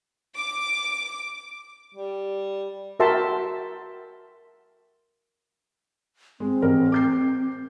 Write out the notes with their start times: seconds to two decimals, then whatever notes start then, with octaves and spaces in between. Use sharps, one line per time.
0.36 D6
1.95 G3
3.00 F#4 A#4 E5 G5 A5 C6
6.40 G#3 C4
6.62 A1 A#4
6.92 D6 G6 C7